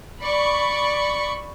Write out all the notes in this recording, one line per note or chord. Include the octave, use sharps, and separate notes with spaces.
D5 B5 C#6